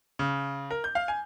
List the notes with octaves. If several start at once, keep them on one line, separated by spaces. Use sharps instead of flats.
C#3
A#4
G6
F5
G#5